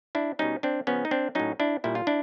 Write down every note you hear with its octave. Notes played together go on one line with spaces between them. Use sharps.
D4 E4
B2 G3 C#4 D#4
C4 D4
C#3 F3 B3 C#4
D#4
C4 D4
A2 F#3 C#4 D#4
D4 E4
A#2 G3 E4
F4
D4 E4